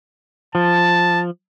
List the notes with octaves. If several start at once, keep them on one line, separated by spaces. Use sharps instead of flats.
F3 A5